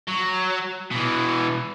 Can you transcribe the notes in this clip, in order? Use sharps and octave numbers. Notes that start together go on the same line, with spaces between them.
F#3
B2 E3